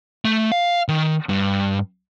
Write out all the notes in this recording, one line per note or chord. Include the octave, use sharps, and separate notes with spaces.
A3
F5
D#3
G2